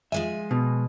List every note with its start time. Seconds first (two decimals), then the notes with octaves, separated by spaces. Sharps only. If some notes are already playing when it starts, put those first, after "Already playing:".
0.12 F3 G#3 E5 G#5
0.51 B2